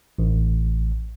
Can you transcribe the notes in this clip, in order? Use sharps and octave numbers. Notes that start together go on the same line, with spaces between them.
A1